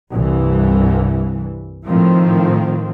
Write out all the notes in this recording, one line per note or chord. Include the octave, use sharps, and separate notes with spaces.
C2 G2 E3
A2 D#3 F3 C4